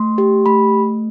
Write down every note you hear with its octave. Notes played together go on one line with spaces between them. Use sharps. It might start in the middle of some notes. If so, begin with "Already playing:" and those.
Already playing: A3 C6
G4
A3 B5